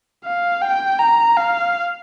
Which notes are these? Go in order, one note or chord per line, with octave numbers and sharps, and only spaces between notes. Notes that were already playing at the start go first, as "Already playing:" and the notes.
F5
G5
A#5
F5